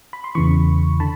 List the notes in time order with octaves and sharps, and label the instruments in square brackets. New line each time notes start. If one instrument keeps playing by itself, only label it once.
[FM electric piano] B5
C6
E2 C#3 E3 B5 C#6
D3 A5 B5